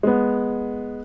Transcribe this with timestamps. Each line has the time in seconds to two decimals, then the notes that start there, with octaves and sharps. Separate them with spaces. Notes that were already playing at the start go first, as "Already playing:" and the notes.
0.03 G#3 B3